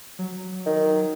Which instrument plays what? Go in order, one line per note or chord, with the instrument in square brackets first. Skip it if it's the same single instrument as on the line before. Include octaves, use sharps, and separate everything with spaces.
[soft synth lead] F#3
[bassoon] D#3